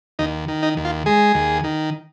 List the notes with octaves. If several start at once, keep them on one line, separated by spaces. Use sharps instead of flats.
D#2 D#4
D#3
D#4
D#2
F4
G#3 G#4
D#2
D#3